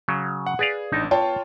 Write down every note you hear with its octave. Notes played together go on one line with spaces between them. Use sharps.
C#3 F#3
F#5
G#4 B4 D5 F5
A1 D4 D#4
B3 F4 C#5 G5 A5